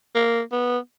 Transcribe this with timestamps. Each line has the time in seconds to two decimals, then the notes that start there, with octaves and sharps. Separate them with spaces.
0.15 A#3
0.52 B3